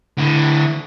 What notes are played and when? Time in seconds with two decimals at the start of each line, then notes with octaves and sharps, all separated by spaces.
0.17 D3 E4